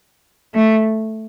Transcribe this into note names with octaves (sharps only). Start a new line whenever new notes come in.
A3